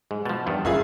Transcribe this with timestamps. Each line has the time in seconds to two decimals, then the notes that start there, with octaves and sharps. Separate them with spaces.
0.11 G#2 G#3
0.25 B2 F3 A5
0.46 E2 G2 D#3
0.65 G1 C#3 F#3 E4 F4 G#4